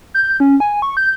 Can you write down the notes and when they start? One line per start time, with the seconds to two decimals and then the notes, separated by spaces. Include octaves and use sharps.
0.14 G6
0.40 C#4
0.60 G#5
0.82 C#6
0.97 G6